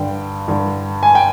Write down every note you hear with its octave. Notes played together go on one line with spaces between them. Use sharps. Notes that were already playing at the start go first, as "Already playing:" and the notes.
Already playing: G2 D3 G5
G2 D3
G#5
G5